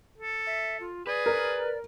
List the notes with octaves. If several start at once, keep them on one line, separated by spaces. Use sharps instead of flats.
A4
E5
F4
G#4 B4 D5
A#4